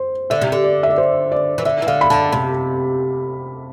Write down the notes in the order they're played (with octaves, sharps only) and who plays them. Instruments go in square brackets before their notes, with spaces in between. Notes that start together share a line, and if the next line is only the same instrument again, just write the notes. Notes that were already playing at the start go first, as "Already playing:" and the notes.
Already playing: [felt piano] C5
[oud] D3 [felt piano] E5
[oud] C3
D3
[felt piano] D5
E5
D5
C5
D5
[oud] E3
[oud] D3 [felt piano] E5
[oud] E3
[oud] D3 [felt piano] F5
[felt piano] B5
[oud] D3 [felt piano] A5
[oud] C3 [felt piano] B5